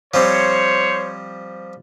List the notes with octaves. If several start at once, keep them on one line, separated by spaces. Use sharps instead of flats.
F3 G3 C4 C5 C#5